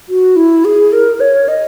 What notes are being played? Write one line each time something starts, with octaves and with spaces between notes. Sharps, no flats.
F#4
E4
G#4
A#4
C#5
D#5